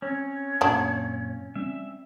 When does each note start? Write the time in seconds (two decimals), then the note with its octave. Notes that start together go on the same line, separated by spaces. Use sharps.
0.02 C4 C#4 C#5
0.61 F#2 A#2 F#3 D4
1.56 G3 C4 C#4 E5